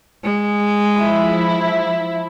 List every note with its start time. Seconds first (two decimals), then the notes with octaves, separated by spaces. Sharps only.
0.23 G#3
0.95 F3 E4